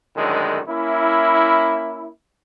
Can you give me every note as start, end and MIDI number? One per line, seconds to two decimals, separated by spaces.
0.16 0.58 42
0.16 0.58 45
0.16 0.58 50
0.16 0.58 51
0.16 0.58 56
0.69 2.08 58
0.69 2.08 61
0.69 2.08 64